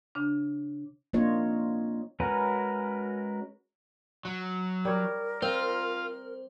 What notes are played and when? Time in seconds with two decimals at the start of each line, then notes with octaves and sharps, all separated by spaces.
0.15 C#3 D4
1.13 A#3 C4 D4 F4 C#5 D#5
2.20 G#3 C#4 F#4 A#4 B4
4.25 F#3
4.85 G3 A#4 C#5
5.42 C4 F4 C5